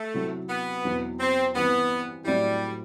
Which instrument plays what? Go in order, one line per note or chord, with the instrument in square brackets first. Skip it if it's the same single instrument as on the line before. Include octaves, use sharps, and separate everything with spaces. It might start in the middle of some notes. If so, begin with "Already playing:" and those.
Already playing: [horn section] A3
[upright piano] C3 F#3 C4 E4
[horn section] B3
[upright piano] E2 B2 F#3 C4 E4
[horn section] C4
[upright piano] G2 E3 G3 C4 [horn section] B3
[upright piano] A2 F#3 C4 E4 [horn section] G3